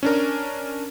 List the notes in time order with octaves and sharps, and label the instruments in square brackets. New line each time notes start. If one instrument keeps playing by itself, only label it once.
[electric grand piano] C#4 D4 A#4